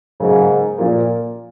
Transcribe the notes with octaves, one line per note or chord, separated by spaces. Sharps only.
G#2 C#3 F#3 A#3
A#2 F3 A#3